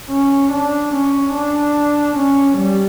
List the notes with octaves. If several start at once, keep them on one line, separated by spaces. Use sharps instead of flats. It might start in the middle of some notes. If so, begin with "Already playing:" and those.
C#4
D4
C#4
D4
C#4
G3